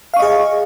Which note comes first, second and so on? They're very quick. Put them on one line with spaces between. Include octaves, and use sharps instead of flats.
F5 C#6 D#5 G#4